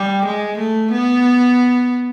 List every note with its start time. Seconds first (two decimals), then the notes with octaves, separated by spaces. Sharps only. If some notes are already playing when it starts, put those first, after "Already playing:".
Already playing: G3
0.25 G#3
0.58 A3
0.91 B3